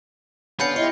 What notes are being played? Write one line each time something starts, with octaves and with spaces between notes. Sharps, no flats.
D3 B3 C#4 F4 B5 G6 C#7
E4 G4 C#5 D#5 C#7